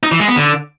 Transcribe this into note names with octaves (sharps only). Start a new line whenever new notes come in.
D#4
E3
G#3
B3
D3